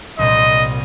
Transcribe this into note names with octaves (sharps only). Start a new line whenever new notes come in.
C2 A#2 G3 D#5